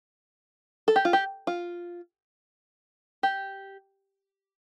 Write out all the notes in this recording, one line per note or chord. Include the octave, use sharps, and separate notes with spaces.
A4
G4
F4
G4
F4
G4